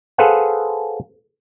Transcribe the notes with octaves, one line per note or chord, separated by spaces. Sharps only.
G#4 A4 B4 C5 F5 F#5